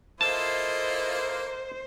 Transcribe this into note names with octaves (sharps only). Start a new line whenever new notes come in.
A#3 E4 F4 A4 C5 D#5 A5